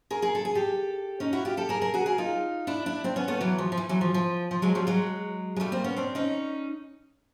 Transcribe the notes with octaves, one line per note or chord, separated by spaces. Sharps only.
G#4 A#4
G#4 A#4
A4
G#4
G4 A4
C#4 D#4
E4 F#4
F4 G4
G4 A4
G#4 A#4
G#4 A#4
F#4 G#4
G#4 A#4
D#4 F4
D4 E4
D4 E4
C4 D4
B3 C#4
A3 B3
E3 F#3
F3
F3
E3
E3 F#3
F3
F3
F3
F#3 G#3
F3 G3
F#3 G#3
G#3
G3 A3
A#3 C4
B3 C#4
C4 D4
C#4 D#4